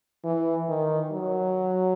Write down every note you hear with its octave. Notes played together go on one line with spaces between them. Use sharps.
E3
D#3
F#3